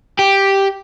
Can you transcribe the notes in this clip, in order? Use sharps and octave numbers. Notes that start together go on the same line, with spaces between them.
G4